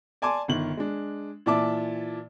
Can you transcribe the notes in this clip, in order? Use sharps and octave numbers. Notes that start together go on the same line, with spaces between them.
D5 G#5 A5 C6 D6
G1 D#3 F#7
G#3 D4
A#2 E3 D5 E5 A5 D6